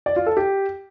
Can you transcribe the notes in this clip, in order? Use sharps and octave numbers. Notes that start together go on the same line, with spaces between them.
D5
F4
A4
G4